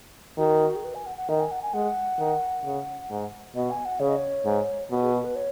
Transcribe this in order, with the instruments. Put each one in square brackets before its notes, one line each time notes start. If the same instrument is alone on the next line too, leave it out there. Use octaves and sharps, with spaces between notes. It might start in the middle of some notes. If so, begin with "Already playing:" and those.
[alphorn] D#3 [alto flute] F#4
[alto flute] G#4
B4
G#5
F#5
F#5
[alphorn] D#3 [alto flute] D#5
[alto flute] G#5
F#5
G#5
[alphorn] G#3 [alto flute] F#5
[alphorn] D#3
C#3
G#2
[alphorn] B2 [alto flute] D#5
[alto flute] G#5
F#5
[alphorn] C#3 [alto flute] C#5
[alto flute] D#5
C#5
[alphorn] G#2
B2
[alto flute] G#4
F#4
B4
C#5